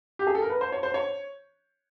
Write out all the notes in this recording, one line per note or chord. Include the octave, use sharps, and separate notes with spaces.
G4
G#4
A4
A#4
B4
C5
C#5
C5
C#5